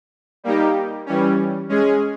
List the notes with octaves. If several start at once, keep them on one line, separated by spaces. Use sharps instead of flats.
G3 A#3 D#4 G4
E3 G3 C#4
G#3 C#4 G#4